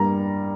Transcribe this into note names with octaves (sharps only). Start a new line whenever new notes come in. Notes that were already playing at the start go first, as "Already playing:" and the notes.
Already playing: G2 G3 A#3 A#5